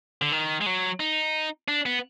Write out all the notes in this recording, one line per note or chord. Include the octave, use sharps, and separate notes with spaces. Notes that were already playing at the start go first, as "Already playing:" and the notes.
D3
D#3
G#3
F#3
D#4
D4
B3